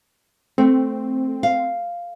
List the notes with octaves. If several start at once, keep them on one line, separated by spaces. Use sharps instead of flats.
A3 C4
F5